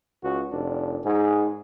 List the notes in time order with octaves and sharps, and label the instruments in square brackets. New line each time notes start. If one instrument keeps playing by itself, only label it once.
[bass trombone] C#2 [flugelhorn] F#4
[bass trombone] F1 [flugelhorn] D4
[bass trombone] G#2 [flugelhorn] G#4